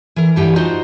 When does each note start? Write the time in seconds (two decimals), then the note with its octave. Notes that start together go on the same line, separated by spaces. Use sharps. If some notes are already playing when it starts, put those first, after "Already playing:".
0.16 E3 A#4
0.36 G2 E3 G4 F#5 G#5
0.56 D#4 F4 F#4 C5 D#5